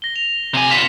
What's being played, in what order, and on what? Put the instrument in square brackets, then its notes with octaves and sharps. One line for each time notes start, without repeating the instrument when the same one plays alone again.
[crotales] A#6 G7
F7
[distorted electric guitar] C3 G#5
[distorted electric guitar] B3 F4 [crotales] B6 E7